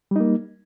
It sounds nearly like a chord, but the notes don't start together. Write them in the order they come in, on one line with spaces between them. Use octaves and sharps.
G3 D#4 A#3